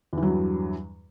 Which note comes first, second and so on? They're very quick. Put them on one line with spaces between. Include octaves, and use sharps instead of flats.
E2 E3 F#3 G2